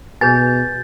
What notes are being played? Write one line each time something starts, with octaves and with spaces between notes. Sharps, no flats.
B2 G#4 B4 G#5 G6 A6